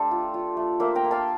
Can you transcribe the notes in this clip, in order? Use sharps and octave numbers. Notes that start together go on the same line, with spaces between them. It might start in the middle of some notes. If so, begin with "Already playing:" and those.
Already playing: A3 D4 G4 A4 C5
F4
F4
A3
A#3 C5 E5
G5 A#5
A#3
F5 A5